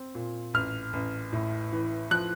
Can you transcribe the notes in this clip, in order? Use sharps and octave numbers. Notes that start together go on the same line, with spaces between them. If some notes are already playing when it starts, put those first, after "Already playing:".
Already playing: C4
A#2
A1 F6
A1
A2
E3
F3 F#6